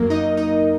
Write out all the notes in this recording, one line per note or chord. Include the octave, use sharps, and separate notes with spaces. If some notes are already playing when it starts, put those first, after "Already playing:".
Already playing: F#2 F#3 A#3 A#4
D#4 D#5
D#4 D#5